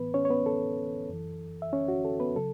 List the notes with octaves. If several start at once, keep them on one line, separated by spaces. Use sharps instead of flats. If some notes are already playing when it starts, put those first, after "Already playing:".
Already playing: A2 E3 B3 B4
C#4 C#5
C#5
B3 B4
A4
F#2 E3
E5
C#4 C#5
F#4
A4
B3 B4
C#3 F#3 A4